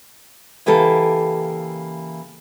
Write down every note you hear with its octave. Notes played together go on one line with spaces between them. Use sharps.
C#3 E3 A#3 G4 A4